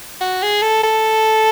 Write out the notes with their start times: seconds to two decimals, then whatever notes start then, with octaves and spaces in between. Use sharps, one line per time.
0.21 F#4
0.43 G#4
0.62 A4
0.84 A4